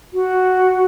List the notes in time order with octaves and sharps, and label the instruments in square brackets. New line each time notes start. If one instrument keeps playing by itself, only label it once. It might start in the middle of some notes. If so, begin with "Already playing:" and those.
[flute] F#4